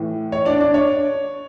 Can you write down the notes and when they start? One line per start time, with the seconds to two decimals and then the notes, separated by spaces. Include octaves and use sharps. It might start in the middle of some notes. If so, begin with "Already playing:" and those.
Already playing: A2 E3
0.32 C#5
0.45 D4 D5
0.60 D4 D5
0.74 C#5